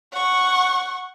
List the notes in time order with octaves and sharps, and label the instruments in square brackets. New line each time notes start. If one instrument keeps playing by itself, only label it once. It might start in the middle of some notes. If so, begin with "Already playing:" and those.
[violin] F#5 C#6